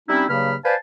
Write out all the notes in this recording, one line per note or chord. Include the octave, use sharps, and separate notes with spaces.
G3 C4 C#4 D#4 E4
G2 C#3 F#3 A#3 B5 F6
B4 C5 D5 F5 G#5 A5